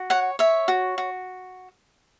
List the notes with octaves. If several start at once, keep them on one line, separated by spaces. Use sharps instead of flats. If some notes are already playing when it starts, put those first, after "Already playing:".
Already playing: F#4
C#5 F#5
C#5 E5
F#4
F#4